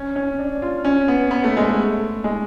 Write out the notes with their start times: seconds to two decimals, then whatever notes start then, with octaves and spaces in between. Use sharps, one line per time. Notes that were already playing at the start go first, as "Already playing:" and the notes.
Already playing: C#4
0.16 C#4
0.39 D4
0.62 F4
0.84 C#4
1.08 B3
1.31 B3
1.44 A3
1.57 G#3
1.69 A3
2.24 G#3